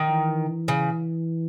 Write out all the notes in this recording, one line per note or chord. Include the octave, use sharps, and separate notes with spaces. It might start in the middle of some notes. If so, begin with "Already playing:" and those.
Already playing: D#3
E3
C#3